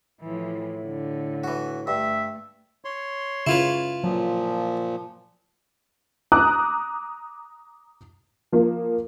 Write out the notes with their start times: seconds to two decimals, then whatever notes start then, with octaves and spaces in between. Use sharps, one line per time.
0.21 A2 E3 F3
0.85 D3
1.44 E3 F#4
1.87 G2 A3 E5
2.85 C#5 C6
3.47 C#3 E4 F4 B4
4.04 A#2 F3 F#3
6.32 A#5 D6 D#6 F#6
8.52 F3 A#3